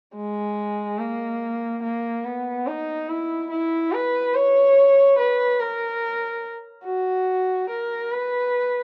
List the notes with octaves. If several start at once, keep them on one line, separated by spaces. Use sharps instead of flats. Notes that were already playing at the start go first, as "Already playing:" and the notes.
G#3
A#3
A#3
B3
D#4
E4
E4
B4
C#5
B4
A#4
F#4
A#4
B4